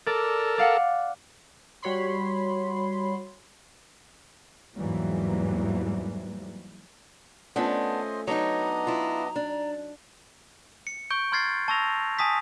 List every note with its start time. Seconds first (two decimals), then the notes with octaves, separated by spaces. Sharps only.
0.07 A4 A#4 D5
0.58 D5 F5 F#5
1.82 G3 F#4 C#5 B5 C6
4.75 E2 G#2 E3 F#3 G3 A#3
7.56 A3 B3 C#4 D4 F4 C5 D#5
8.28 F#3 B3 D4 D#4 C#5 D#5 A#5
8.87 E4 F4
9.36 D4
10.87 C#7
11.10 C#6 G6 D7
11.32 A#5 C6 F6 G#6 A6 C7
11.68 A5 C#6 E6 A#6 F7
12.19 G#5 A5 D#6 B6